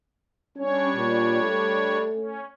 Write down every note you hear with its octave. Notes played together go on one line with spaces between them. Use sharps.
G3 C#4 D4 C#5
A#2
A3
C#4